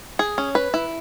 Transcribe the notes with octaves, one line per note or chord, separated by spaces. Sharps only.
G#4
C#4
B4
E4